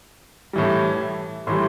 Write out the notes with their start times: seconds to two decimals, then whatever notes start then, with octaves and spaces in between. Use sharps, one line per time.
0.53 A2 E3 G3
1.47 A2 E3 G3 C6